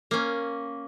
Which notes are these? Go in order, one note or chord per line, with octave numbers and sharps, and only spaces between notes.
A#3 C#4